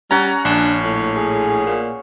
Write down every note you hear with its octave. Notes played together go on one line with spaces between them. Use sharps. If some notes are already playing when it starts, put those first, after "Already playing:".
G3 C#4 F#5 A#5
A#1 D4
A2
G#4
A#2